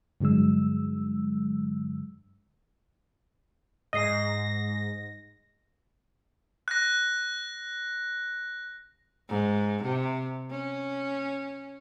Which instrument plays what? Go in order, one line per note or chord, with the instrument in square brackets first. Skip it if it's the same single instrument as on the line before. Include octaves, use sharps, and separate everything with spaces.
[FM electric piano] G2 D3 F#3 G#3 E6
[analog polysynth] G#2 A#6 [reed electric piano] D#5 [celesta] D#6 C7
[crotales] F#6 A#6
[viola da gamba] G#2
C3
C#4